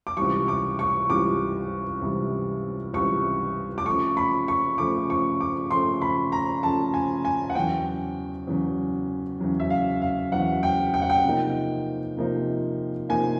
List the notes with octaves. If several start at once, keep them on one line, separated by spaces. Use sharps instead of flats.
D6
C#2 C3 E3 G3 C#6
D6
C#6
C#2 C3 E3 G3 D6
C#2 C3 E3 G3
C#2 C3 E3 G3 C#6
D6
C#3 F3 A3 C#6
B5
C#6
C#3 F3 A3 D6
C#6
D6
C#3 F3 A3 C6
B5
A#5
C#3 F3 A3 A5
G#5
G#5
F#5
E2 C#3 F#3 G5
E2 C#3 F#3
E2 C#3 F#3
E5
F5
F5
E2 C#3 F#3 F#5
G5
G5
F#5
G5
C3 F3 A#3 D#4
C3 F3 A#3 D#4
C3 F3 A#3 D#4 G#5